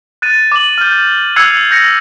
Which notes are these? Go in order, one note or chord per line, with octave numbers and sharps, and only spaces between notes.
F#6 A6 D#7
D6 F#7
F6 G6
E6 F#6 G#6 C7 C#7 F7
G6 A#6 C#7